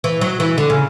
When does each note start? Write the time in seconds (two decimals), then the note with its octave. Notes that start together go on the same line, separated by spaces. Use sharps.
0.04 E3
0.21 F#3
0.40 E3
0.58 D3
0.70 C#3